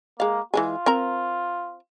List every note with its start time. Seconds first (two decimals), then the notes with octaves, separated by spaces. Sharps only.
0.20 G#3 A#3 F5
0.54 E3 G#3 F4 G#4
0.86 C4 A#4 A#5